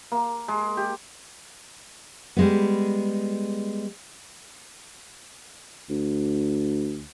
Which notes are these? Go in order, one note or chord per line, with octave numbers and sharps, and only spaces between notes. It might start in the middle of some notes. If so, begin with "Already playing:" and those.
A#3
G#3
G4
G3 G#3 B3
D2